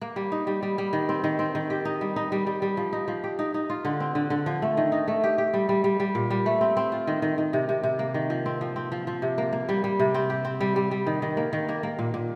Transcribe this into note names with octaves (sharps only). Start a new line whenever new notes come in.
A#3
G3
D#4
G3
G3
G3
D#3
C4
D#3
C4
D#3
G4
D#4
G3
D#4
G3
G3
G3
F3
D#4
F3
G4
D#4
D#4
F4
D3
C4
D3
D3
F3
A3
D#3
D#4
A3
G4
G4
G3
G3
G3
G3
A#2
G3
A3
C4
C4
F4
D#3
D#3
D#3
C3
C3
C3
A#3
D#3
F3
C4
F3
C4
F3
F3
C3
A#3
A#3
G3
G3
C3
C4
G4
C4
G3
G3
G3
D#3
D#3
A#3
D#3
A#3
A#3
A#2
A#2